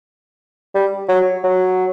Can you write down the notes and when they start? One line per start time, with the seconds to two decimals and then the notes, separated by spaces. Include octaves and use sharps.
0.75 G3
1.08 F#3
1.44 F#3